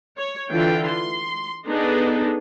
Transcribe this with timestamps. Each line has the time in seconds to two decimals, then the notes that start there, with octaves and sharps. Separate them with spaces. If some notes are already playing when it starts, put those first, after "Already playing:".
0.17 C#5
0.51 D3 E3 F4 G5
0.87 C6
1.67 B3 D4 D#4 G#4 A4